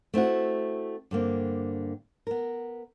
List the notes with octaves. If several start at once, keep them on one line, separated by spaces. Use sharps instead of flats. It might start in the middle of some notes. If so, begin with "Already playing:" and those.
A3 C4 E4 F#4
G2 D3 A#3 C4
B3 A#4